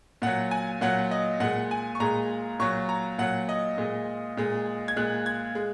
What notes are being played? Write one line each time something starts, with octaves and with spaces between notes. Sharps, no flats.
A#2 F#3 F#5
G#5
A#2 F#3 F#5
D#5
A#2 G#3 F#5
G#5
C#6
A#2 G#3 A#5
A#2 F#3 C#6
A#5
A#2 F#3 F#5
D#5
A#2 G#3
A#2 G#3
G#6
A#2 G#3 F#6
G#6
G#3